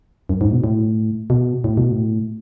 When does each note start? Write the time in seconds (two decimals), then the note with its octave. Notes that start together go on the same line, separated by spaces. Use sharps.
0.29 F#2
0.41 G#2
0.48 A2
0.52 B2
0.64 A2
1.30 B2
1.64 A2
1.77 B2
1.91 A2